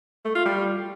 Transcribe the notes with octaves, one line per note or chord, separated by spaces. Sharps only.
A3
F4
G3